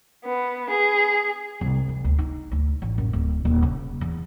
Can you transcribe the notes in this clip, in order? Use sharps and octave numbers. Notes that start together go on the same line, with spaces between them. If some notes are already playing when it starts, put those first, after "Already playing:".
B3
G#4
C2
D#3
D2
D#4
D2
A1
F#2
D1
D#1
C#3
E2